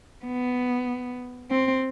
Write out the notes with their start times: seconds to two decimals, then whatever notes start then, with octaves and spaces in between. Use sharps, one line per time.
0.25 B3
1.51 C4